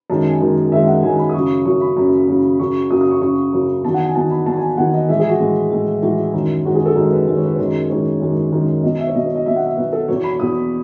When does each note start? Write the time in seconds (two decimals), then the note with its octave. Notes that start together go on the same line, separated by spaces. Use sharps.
0.10 F#2 D#3 G#3 A5
0.25 G#5
0.41 F#2 D#3 G#3
0.72 F#2 D#3 G#3 E5
0.88 F#5
1.03 F#2 D#3 G#3 G#5
1.18 B5
1.29 D#6
1.34 F#2 C#3 F#3 C#6
1.65 F#2 C#3 F#3 C#6
1.81 B5
1.97 F#2 C#3 F#3
2.28 F#2 C#3 F#3
2.59 F#2 C#3 F#3 C#6
2.90 F#2 C#3 F#3 D#6
3.01 D#6
3.11 C#6
3.21 F#2 C#3 F#3 C#6
3.53 F#2 C#3 F#3
3.84 E2 D#3 F#3 A5
3.94 F#5
4.05 G#5
4.15 E2 D#3 F#3 A5
4.31 B5
4.46 E2 D#3 F#3 A5
4.57 G#5
4.77 E2 D#3 F#3 F#5
4.94 D#5
5.09 A2 E3 G#3 E5
5.19 G#4
5.29 F#4
5.40 A2 E3 G#3
5.71 A2 E3 G#3
6.02 A2 E3 G#3 F#4
6.18 E4
6.34 F#2 D#3 G#3
6.65 F#2 D#3 G#3 F#4
6.75 G#4
6.86 A4
6.96 F#2 D#3 G#3
7.12 B4
7.27 F#2 D#3 G#3 D#5
7.36 C#5
7.45 B4
7.54 C#5
7.59 F#2 D#3 G#3
7.90 F#2 D#3 G#3 C#5
8.21 F#2 D#3 G#3
8.52 F#2 D#3 G#3
8.83 B2 F#3 D#5
8.99 E5
9.07 C#5
9.15 B2 F#3 D#5
9.25 C#5
9.35 D#5
9.46 B2 F#3 E5
9.56 F#5
9.66 E5
9.77 B2 F#3 B4
9.93 A4
10.08 E2 B2 F#3 C#5
10.24 B5
10.39 E2 B2 F#3 D#6